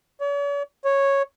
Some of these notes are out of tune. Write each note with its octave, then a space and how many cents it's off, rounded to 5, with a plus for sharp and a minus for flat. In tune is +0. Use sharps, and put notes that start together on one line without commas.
C#5 +45
C#5 -5